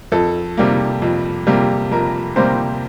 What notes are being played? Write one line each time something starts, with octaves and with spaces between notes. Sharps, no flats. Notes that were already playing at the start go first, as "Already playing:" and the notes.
F2 A4
C3 G3 A#3
F2
C3 G3 A#3
F2 A#4
C3 G3 A#3 C5